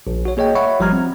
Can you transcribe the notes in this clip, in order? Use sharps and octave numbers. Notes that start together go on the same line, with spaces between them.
A#1
F#4 C#5
A#3 G#4 C#5 D#5 G5
C#5 E5 F#5 B5 C#6
G#1 F3 G3 A#5 F6 G#6
C4